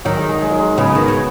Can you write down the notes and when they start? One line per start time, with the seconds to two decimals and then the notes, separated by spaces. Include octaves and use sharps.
0.05 D#3 F#3
0.17 G#3
0.29 G#3
0.41 G#3
0.51 F#3
0.59 G#3
0.77 C#3 F#3 B3
0.95 D#3
1.08 C#3